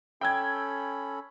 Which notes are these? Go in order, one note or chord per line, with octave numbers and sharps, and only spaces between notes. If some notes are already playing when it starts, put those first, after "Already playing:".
C#4 A4 G5 B5 E6 G#6